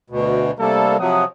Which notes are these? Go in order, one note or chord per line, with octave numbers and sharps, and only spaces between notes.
D2 B2
C3 G3 A3 A#3 D4 A4
C3 F3 F#3 F#5 D#6